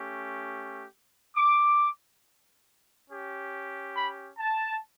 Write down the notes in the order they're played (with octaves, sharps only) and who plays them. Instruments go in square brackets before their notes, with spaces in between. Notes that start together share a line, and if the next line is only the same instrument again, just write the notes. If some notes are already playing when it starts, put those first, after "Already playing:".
Already playing: [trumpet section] A3 C#4 G4
D6
C#4 G4
B5
A5